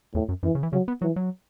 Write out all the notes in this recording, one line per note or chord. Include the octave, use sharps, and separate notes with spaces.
E2 A2
F#2
F#2 E3
C#3
E3
C#3 F#3
B3
E3 F#3
F#3